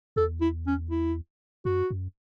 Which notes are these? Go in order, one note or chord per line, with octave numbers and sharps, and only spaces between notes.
E2 A4
E4
C#4
E4
F#2 F#4
F#2